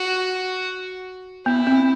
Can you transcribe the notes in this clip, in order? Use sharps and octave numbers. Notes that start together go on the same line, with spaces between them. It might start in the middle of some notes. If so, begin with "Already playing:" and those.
Already playing: F#4
B3 E4
C4